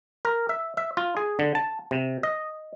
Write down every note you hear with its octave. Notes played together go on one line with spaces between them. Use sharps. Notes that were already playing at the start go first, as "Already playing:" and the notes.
A#4
E5
E5
F4
G#4
D3
A5
C3
D#5